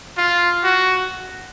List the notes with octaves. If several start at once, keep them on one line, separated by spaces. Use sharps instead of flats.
F4
F#4